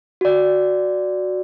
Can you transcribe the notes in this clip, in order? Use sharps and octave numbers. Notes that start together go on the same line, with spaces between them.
F#4 D5